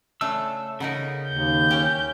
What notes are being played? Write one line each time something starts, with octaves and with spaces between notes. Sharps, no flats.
C#3 A3 D4 E6
C#3 B3 D#4 A#4
D#2 G6
C#4 G4